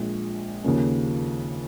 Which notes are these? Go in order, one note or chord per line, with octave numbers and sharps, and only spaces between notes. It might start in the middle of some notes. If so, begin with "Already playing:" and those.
Already playing: A#1 A#2 G#3
D#2 C#3 F3 A#3 C#4